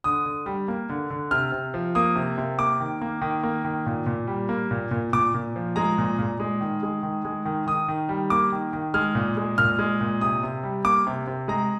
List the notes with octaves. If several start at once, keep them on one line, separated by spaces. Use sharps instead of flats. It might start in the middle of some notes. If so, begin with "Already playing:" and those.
D3 D#6
D3
G3
A#3
D3
D3
C3 F6
C3
F3
A#3 D#6
C3
C3
A#3 D6
D#3
A#3
D#3
A#3
D#3
A#2
A#2
G3
A#3
A#2
A#2
A#2 D6
A#2
F3
G#3 A#5
A#2
A#2
G#3
D#3
G#3
D#3
G#3
D#3
D#3 D#6
D#3
G3
A#3 D6
D#3
D#3
G#3 F6
A#2
G#3
A#2 F6
G#3
A#2
C3 D#6
C3
G3
A#3 D6
C3
C3
G#3 A#5